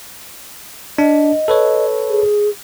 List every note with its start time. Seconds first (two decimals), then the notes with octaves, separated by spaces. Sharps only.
0.98 D4 D#5
1.48 A4 B4 C#5
2.09 G#4